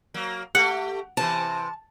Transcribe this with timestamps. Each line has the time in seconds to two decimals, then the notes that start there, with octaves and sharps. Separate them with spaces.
0.14 F#3 A#3
0.55 A3 G4 F#5
1.17 C3 E3 A5